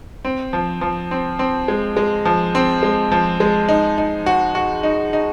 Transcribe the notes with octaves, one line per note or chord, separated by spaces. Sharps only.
C4
F3
F3
C4
C4
G#3
G#3
F3
C4
G#3
F3
G#3
D#4
D#4
F#4
F#4
D#4
D#4